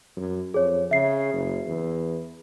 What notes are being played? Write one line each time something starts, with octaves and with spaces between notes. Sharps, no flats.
F#2
F2 G#4 C#5
C#3 E5 C7
F#1
E2